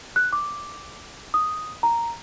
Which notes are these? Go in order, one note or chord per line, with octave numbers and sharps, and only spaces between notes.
F#6
D6
D#6
A#5